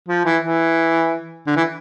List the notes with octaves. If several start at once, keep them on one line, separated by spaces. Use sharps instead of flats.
F3
E3
E3
D3
E3